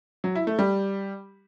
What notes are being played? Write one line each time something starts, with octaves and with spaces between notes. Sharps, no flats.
F#3
E4
A3
G3